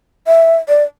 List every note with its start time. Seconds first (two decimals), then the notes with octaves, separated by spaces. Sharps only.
0.27 E5
0.69 D5